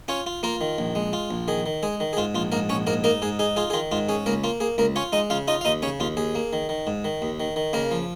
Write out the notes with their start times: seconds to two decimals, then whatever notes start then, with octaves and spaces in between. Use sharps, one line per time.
0.08 C#4 F4 C#5
0.26 F4
0.43 A#3 F4 A#4
0.61 D#3
0.78 A#1
0.95 G#3
1.13 F4
1.31 A#1
1.48 D#3 G#4
1.66 D#3
1.83 G#3 G#4
2.00 D#3
2.13 G#4
2.17 G#2 F4
2.35 A#1 F4
2.52 G#2 A#3 A#4
2.69 A#1 C#4 C#5
2.87 G#2 A#3 A#4
3.04 A#3 D#4 A#4
3.22 G#2 G#4
3.39 D#4 G#4
3.56 F4 G#4
3.70 G#4
3.73 D#3 F4
3.91 G#2 F4
4.09 C#4 G#4
4.26 C#2 A#3 A#4
4.44 A#3 F4
4.60 A#3 G#4
4.78 C#2 A#3 A#4
4.96 C#4 F4 C#5
5.12 G#3 D#4 D#5
5.30 C#3 F4 F5
5.48 D#4 F4 D#5
5.61 F5
5.65 D#2 D#4 D#5
5.82 C#3 C#4 C#5
6.00 D#2 F4
6.17 D#2 G#4
6.35 A#3
6.53 D#3
6.69 D#3
6.87 G#2
7.04 D#3
7.22 D#2
7.40 D#3
7.56 D#3
7.73 C#3 A#3 A#4
7.91 F3